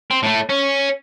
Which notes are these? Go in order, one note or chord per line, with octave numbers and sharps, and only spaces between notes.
C4
A2 A3
C#4